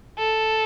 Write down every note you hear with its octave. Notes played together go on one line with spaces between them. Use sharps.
A4